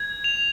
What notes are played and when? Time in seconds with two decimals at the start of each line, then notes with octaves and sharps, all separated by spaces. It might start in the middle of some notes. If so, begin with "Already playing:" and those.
Already playing: G#6
0.24 F7